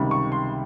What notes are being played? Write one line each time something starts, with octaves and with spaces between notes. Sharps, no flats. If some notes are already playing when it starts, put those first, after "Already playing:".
Already playing: C#2 C3 D#3 G3
C#6
C6